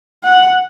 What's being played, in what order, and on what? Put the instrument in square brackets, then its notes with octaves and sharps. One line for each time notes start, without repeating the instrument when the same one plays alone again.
[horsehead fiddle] F#5